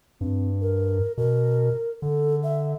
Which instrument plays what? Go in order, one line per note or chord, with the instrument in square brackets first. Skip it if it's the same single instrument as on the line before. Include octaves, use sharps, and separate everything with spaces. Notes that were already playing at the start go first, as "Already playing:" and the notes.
[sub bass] G2 [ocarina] C4
[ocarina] A#4
[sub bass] B2 [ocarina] A#4
[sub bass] D3 [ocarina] A4
[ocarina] E5